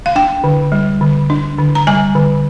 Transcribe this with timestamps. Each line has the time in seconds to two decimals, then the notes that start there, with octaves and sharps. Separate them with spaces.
0.06 F5
0.16 D4 G5
0.44 D3
0.72 G3
1.01 D3
1.30 D4
1.58 D3
1.75 A#5
1.87 G3 G#5
2.15 D3